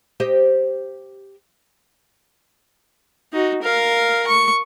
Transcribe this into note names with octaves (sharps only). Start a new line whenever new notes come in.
G4 C5 D#5
D#4 F#4
A#4 F5
C#6